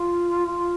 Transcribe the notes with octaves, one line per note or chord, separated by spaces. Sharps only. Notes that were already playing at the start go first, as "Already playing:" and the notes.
Already playing: F4
F4